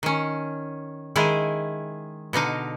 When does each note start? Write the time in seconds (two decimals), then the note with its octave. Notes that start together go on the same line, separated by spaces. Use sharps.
0.03 D#3 C#4
1.16 D#3 G#3 E4 G#4
2.33 B2 D3 D#4 F5